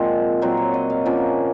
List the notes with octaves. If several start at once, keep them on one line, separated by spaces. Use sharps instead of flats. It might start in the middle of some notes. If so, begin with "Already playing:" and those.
Already playing: A#2 F3 G#3 C4 F#5
A#2 F#3 C4 C5
C#5
D#5
F5
F3 A#3 C#4 F#5